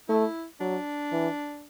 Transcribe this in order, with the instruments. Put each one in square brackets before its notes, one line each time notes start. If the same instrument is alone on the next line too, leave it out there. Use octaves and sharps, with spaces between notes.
[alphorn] A3 [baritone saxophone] E4
[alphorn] F#3 [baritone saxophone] D4
[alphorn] E3